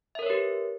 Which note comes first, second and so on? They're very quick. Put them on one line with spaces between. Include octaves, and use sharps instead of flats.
E5 A#4 C#5 B4 G4